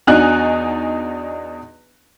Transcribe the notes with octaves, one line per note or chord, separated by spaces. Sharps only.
E2 D4 D#4 F#4 G#5 F#6